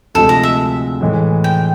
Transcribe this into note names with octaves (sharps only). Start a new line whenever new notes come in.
D2 C3 F3 G#3 A4
D#5
E5
A2 E3 G#3
G5